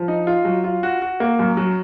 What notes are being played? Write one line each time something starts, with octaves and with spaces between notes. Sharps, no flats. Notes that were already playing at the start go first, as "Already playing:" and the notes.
Already playing: F3
D#4
F4
F#3
F4
F#4
F#4
A#3
F#2
F#3